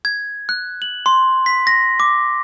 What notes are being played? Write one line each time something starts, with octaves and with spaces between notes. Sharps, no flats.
G#6
F#6
F#7
C6
B6
A#6
D6